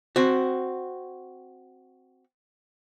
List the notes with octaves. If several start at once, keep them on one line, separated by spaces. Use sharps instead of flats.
C4 F#4